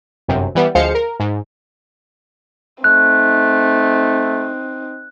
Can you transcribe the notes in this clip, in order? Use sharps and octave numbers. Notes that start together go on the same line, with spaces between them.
G1 F#2 C3
E3 G3 B3
D2 F3 G#3 C5 F5 C#7
A#4
G#2
A3 C4 D#4 F#6